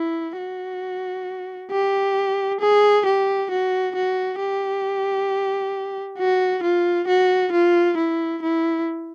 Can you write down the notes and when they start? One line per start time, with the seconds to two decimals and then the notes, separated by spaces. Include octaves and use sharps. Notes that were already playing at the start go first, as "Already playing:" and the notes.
Already playing: E4
0.38 F#4
1.72 G4
2.61 G#4
3.06 G4
3.51 F#4
3.95 F#4
4.40 G4
6.18 F#4
6.63 F4
7.08 F#4
7.52 F4
7.97 E4
8.42 E4